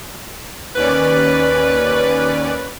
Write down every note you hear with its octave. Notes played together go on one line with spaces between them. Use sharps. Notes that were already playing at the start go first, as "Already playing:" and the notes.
D#2 C#4 B4 D5